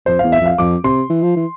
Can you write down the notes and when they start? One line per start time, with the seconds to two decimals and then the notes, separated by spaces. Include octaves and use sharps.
0.06 F2 C5
0.19 E2 F5
0.32 E5
0.41 F2 F5
0.58 F2 D6
0.84 C3 C6
1.10 E3
1.23 F3
1.36 E3